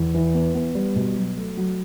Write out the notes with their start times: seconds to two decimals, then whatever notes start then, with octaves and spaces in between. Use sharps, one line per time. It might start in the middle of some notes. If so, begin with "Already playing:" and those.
Already playing: E2
0.14 E3
0.34 B3
0.54 B3
0.75 G3
0.96 B2
1.16 F#3
1.37 A3
1.57 F#3